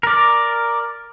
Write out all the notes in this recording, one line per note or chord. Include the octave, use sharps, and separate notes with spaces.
A#4 D5